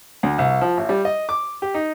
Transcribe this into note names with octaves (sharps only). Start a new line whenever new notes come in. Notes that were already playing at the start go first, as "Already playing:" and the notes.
D2
C2
F3
A1
G3
D#5
D6
G4
D#4